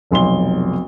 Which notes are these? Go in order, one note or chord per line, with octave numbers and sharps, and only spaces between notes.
F1 B1 C6 G7